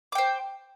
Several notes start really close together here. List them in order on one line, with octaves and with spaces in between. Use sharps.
D6 G5 C5